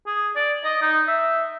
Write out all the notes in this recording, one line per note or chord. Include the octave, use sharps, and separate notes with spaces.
G#4
D5
D#5
D#4
E5